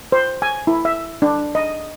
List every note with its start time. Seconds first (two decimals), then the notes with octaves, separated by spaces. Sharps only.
0.12 C5
0.42 G#5
0.67 E4
0.85 E5
1.22 D4
1.55 D#5